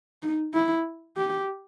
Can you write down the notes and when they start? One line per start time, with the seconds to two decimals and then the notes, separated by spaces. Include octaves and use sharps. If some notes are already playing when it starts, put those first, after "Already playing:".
0.22 D#4
0.54 E4
1.17 G4